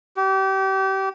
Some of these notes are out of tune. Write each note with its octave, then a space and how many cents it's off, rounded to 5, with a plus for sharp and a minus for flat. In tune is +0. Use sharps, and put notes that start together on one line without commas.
G4 -30